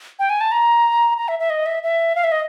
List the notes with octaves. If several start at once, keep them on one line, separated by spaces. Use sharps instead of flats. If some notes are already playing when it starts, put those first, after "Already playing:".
G5
G#5
A5
A#5
A#5
E5
E5
D#5
E5
E5
F5
E5
D#5